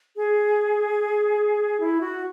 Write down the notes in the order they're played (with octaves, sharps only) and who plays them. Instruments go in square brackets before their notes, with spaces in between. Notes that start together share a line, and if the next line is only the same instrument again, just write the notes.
[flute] G#4
E4
F#4